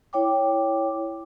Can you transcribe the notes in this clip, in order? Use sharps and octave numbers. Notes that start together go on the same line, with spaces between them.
E4 C#5 G5 D6